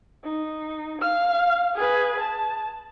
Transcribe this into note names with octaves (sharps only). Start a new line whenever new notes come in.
D#4
F5 F6
G#4 B4
A5